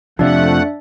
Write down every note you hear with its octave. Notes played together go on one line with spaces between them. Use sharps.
F2 C3 F3 A3 D4 D5 E5 F#5